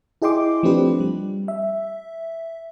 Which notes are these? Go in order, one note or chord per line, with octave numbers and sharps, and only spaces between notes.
E4 G#4 D#5 G5 C6 D6
F3 A3 C4 D4 G4 B4
G3
E5